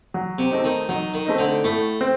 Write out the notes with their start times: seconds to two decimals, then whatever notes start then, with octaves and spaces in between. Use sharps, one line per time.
0.14 F#3
0.38 C3
0.51 A3 C4 D#4
0.64 D#3
0.89 D#3 F#3
1.14 D#3
1.26 A3 C4 D#4
1.39 D3
1.64 A2 A3
2.01 C4